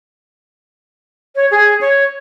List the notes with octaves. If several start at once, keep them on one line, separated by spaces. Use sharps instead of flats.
C#5
G#4
C#5